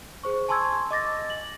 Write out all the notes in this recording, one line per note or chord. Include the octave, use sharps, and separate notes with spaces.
G#4 C5 C#6
G#5 A5 C6 C#6 E6 G#6
D#5 D6 A6 A#6
F#7